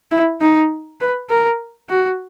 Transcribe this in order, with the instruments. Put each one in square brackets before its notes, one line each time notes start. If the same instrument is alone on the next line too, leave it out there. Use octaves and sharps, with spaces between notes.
[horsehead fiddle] E4
D#4
B4
A#4
F#4